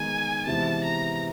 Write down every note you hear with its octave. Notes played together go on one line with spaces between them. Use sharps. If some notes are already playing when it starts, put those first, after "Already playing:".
Already playing: D#3 G#3 B3 D#4 G#5
C3 E3 G#3 B3 A5
A#5